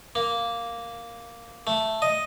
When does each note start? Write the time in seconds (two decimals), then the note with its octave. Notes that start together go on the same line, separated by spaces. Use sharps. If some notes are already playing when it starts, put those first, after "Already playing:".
0.15 A#3
1.67 A3
2.02 D#5